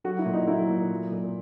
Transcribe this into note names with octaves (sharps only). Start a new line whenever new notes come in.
F#3 F#4
E4
A#2
D#4
F#3 E4
A#2
F#3
A#2